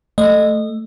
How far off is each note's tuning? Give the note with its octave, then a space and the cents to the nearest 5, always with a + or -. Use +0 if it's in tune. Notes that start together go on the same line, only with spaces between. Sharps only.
A3 +0 D#5 -20